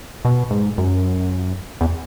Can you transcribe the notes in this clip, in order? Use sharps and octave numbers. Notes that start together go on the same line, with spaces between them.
B2
G#2
F#2
E2